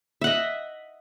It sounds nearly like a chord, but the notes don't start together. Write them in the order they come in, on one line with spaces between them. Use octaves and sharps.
E5 F#5 D#5